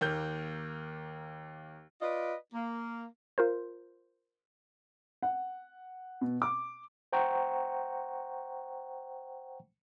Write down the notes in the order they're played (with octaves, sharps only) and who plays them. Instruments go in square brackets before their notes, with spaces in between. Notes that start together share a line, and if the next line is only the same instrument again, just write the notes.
[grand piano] D#2 A#3 G6
[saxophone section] F4 B4 D5 D#5
A#3
[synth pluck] F4 A#4 C5
[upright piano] F#5
B2
D6
[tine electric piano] C5 F#5 G5 A#5 C#6